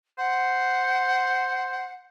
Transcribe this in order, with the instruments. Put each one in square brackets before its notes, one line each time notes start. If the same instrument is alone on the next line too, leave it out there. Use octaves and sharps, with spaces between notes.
[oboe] C5 [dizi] F#5